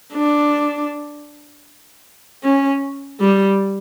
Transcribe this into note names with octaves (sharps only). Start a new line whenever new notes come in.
D4
C#4
G3